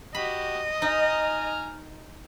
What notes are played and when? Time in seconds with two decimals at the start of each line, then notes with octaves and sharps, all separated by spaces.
0.15 F#4 G4 D#5 B5
0.82 D#4 G#5 A#5 F6